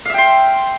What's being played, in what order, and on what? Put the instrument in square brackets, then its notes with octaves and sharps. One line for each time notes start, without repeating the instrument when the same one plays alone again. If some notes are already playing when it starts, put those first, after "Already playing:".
[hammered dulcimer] F5
E5
G5
C6